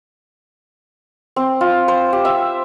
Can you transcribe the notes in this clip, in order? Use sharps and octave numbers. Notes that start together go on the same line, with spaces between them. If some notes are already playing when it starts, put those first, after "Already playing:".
C4
F4
C5
G4
E5